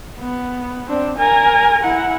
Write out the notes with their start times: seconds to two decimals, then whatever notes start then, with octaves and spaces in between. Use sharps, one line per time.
0.19 B3
0.89 C4 D4
1.18 A#4 G#5
1.84 E4 F#5